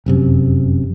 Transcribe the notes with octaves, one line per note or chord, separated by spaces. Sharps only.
F1 F#2 C3